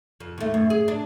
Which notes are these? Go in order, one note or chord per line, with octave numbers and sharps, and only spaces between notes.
F2
D#2 A3
F#2
G#4
D4